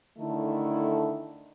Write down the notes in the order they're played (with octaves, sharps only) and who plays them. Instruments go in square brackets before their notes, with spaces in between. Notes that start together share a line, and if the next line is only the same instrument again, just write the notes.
[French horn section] D3 D#3 A3 E4 A4